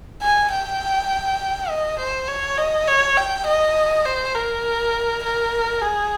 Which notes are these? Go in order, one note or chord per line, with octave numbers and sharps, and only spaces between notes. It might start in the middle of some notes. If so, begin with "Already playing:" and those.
G#5
G5
D#5
C5
C#5
D#5
C#5
G5
D#5
C5
A#4
A#4
G#4